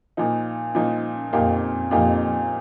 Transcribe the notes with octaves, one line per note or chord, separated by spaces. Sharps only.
A#2 F3 D#4
A#2 F3 D#4
F2 A#2 A#3 D#4 G4
F2 A#2 A#3 D#4 G4